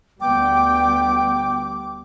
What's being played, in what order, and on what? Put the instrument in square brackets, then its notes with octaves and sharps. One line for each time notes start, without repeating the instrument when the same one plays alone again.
[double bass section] D2 G3 B3 [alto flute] G5 [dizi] D6